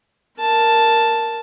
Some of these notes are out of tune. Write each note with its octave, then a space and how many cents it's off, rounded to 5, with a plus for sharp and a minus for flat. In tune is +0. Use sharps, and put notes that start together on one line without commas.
A#4 +0 A5 +0